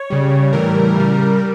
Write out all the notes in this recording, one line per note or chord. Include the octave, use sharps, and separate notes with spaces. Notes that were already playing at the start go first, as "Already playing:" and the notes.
Already playing: C#5
C#3 G3
A2 E3 G3 A#4
C#3 G3
G3